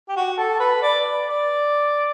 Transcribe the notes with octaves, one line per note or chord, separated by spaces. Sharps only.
G4
F#4
A4
B4
D5
D5